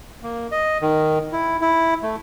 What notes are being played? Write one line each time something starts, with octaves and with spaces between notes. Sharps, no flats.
A#3
D#5
D#3
E4
E4
A3